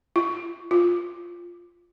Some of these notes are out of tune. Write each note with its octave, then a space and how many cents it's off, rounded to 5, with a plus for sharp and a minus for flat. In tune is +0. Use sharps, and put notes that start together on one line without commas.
F4 -45
F4 +0